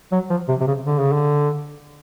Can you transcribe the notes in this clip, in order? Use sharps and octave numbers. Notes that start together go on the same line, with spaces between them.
F#3
F3
C3
C3
C#3
D3
C#3
D3